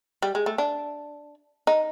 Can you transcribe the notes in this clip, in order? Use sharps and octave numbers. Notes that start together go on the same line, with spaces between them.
G3
G#3
A3
D4
D#4